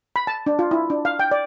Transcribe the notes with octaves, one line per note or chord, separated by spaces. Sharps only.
B5
A5
D4
F4
E4
D4
F5
G5
D5